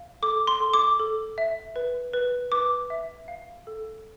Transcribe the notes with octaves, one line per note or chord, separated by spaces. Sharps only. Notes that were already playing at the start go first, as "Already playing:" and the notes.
Already playing: F5
A4 D6
C6
A4
D6
A4
E5
B4
B4
B4 D6
E5
F5
A4